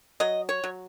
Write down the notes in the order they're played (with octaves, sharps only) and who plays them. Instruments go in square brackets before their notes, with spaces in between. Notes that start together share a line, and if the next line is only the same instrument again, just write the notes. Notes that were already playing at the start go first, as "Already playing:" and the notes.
[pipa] F#3 D#5
C#5
F#3